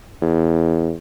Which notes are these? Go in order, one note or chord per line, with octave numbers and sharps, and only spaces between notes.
E2